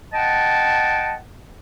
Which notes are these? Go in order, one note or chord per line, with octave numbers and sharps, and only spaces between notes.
D#5 F#5 G5 A5